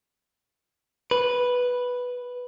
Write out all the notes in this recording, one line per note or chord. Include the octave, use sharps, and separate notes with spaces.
B4